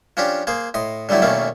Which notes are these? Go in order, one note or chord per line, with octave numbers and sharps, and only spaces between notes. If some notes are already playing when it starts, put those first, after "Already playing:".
F3 C#4 D4 G4
A#3 G#4 C5
A2 D#5 C6
D3 F#3 G3 A3 E4
E2 B2 D#3 A3 A#3 C#4